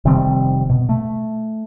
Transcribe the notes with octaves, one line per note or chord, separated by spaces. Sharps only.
F1 D#3 G3 C4
B2
A3